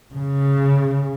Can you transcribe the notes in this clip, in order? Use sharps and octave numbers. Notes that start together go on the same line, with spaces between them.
C#3